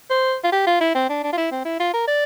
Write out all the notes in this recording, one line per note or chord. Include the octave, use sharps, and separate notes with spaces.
C5
F4
G4
F4
E4
C4
D4
D4
F4
E4
C4
E4
F4
A#4
D5